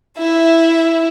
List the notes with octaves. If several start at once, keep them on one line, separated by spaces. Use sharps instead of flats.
E4 E5